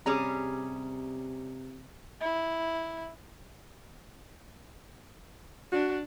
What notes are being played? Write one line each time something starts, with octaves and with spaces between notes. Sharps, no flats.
C3 G3 C#4 G#4 A#5 D6
E4
D4 F#4